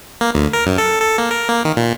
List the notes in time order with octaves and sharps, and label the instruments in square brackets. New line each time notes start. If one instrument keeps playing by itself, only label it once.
[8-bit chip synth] A#3
D2
A#4
F#2
A4
A4
A#3
A#4
A#3
D#3
A#2